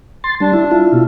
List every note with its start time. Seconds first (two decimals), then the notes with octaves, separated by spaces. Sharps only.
0.24 C6 A6
0.40 G3 D4
0.53 E4
0.71 E4 F4
0.92 B2